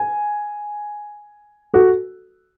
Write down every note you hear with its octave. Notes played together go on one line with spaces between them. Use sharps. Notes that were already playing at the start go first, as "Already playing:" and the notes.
Already playing: G#5
F#4 A4